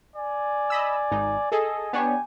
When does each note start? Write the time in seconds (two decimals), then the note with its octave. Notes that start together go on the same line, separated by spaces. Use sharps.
0.14 D5 G#5
0.70 D#5 B5 E6
1.11 G#1 D#4
1.52 G#4 A4 D#5 G#5
1.93 B3 D4 G4 C#5 G#5